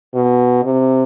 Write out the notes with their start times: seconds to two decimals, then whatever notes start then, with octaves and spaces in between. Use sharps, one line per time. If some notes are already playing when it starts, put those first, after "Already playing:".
0.14 B2
0.64 C3